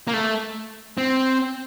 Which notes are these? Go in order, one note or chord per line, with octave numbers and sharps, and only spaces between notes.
A#3
A3
C4